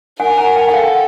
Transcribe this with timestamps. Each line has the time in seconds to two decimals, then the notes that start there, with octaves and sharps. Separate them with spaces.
0.19 A#4 F#5 G#5
0.37 G#5 A#5
0.56 G5 A5
0.68 F#5
0.74 A4 F5 G5